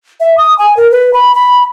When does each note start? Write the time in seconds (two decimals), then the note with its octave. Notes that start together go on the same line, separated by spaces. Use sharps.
0.20 E5
0.38 D#6
0.59 G#5
0.77 A#4
0.91 B4
1.13 B5
1.35 B5